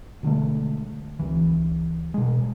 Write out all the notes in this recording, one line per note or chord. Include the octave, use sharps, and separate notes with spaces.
B2 D3 G#3 A3
C#2 E3
B2 G#3